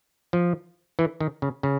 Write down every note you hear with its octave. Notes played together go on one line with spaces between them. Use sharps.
F3
E3
D#3
C#3
C#3